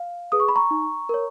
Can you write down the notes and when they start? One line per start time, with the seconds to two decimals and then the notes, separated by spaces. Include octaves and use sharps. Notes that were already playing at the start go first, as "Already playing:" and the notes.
Already playing: F5
0.32 G#4 B4 D#6
0.40 C#6
0.48 B5
0.56 A#5 C#6
0.71 D#4
1.09 A#4 C#5